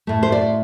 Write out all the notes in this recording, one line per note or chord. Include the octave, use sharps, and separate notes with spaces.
A2 A3
C5
D5